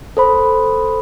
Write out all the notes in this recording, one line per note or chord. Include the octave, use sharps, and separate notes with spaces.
A4 C5 B5